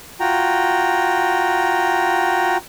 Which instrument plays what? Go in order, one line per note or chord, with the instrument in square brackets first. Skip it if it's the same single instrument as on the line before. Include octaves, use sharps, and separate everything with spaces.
[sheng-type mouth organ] F4 F#4 G5 A#5